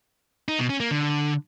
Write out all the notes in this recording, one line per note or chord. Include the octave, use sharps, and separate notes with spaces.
D#4
B2
C#4
A#3
D3